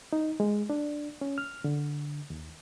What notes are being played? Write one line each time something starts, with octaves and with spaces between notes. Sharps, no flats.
D#4
G#3
D4
C#4
F6
D3
D#2